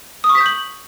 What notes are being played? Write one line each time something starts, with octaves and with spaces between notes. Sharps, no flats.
D#6
C#6
B6
G6
F#7